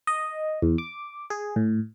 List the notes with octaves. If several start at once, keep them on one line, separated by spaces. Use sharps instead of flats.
D#5
E2
D6
G#4
A2